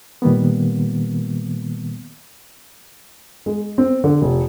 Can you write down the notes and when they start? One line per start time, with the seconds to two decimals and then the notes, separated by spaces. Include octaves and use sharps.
0.22 A#2 D#3 G3 A#3 B3
3.46 G#3
3.78 C4
4.04 D3
4.22 F1